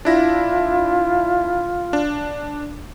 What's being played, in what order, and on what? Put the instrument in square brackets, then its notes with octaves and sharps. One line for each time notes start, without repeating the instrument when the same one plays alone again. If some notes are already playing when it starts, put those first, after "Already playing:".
[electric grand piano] D4 E4 A#6 [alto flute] F4
[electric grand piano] D4